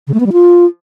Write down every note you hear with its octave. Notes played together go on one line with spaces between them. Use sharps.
C#3
A3
B3
G3
F4